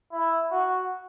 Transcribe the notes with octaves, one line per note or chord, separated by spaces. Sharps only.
E4
F#4